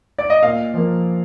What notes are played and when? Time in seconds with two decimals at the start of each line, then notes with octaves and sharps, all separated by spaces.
0.18 D5
0.30 D#5
0.43 A#2 F5
0.74 F3 A#3